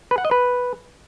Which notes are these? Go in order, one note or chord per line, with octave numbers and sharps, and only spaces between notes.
B4
F#5
D#5
B4